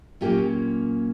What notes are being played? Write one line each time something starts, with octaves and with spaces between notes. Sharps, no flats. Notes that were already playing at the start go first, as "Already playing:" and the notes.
A#2 F#3 A#3 C#4 F4 G4